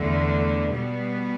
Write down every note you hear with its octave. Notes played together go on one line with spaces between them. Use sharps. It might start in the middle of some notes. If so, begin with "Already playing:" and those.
Already playing: E2 D3 A3
B2 G3 B3